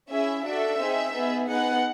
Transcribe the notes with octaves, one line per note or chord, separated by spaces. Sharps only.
C#4 E4 G#4 E5
D4 F#4 A4 E5
C4 D#4 G#4
B3 D#4 G#4
B3 D#4 G#4 F#5